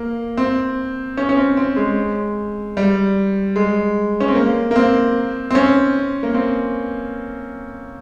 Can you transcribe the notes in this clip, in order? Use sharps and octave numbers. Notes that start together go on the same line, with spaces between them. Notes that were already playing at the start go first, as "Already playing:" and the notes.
Already playing: A#3
C4
C#4
C#4
C4
C4
G#3
G3
G#3
C#4
C4
A#3
A#3
C4
C4
C#4
A#3
C4